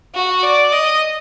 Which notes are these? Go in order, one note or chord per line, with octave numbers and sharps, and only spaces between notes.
F#4
D5
D#5